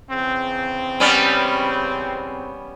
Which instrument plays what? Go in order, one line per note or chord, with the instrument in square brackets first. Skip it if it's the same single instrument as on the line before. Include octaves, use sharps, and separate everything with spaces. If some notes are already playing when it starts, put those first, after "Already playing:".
[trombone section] E2 C#3 C4
[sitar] G3 B3 C#4